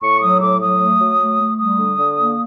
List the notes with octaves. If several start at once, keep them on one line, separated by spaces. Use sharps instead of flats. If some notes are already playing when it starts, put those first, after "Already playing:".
A2 C#6
F#3 D#6
A2 D6
F#3 D#6
A3
F#3
A3
A3
G3 D#6
D3
D3
A#3